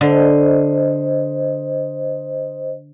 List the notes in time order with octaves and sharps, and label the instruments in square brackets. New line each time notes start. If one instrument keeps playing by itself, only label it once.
[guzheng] D3 [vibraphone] C5 D#5